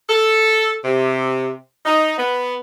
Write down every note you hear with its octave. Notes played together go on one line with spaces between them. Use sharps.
A4
C3
D#4
B3